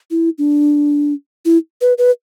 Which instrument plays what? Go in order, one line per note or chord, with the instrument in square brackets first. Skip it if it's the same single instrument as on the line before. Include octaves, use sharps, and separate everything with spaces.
[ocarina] E4
D4
E4
B4
B4